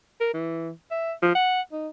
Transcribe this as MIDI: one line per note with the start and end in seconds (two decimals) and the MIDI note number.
0.20 0.29 70
0.34 0.71 52
0.91 1.13 76
1.22 1.31 53
1.35 1.61 78
1.72 1.88 63